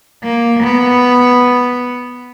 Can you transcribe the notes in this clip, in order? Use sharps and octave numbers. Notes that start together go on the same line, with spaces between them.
A#3
B3